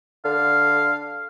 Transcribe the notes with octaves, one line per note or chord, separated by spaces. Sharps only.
D3 F5